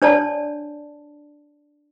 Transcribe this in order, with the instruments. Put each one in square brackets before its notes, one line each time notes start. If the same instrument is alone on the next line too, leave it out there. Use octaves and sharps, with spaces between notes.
[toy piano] D4 C#5 D5 A5